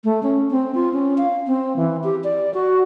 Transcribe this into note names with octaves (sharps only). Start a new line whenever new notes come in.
A3
C#4
C4
F4
C#4
F5
C4
E3
G4
D5
F#4